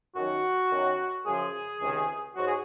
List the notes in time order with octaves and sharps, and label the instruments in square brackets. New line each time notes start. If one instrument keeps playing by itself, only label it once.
[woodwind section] F#2 D#3 F#3 F#4
F#2 D#3 F#3
F#2 C#3 F3 G#4
C#2 C3 D#3
G#2 F#3 F#4
G#4